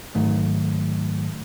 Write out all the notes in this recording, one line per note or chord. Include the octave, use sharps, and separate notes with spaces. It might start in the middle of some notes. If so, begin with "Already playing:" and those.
G#2 D#3 F#3 A3